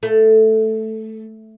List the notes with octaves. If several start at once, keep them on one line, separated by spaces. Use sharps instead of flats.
A3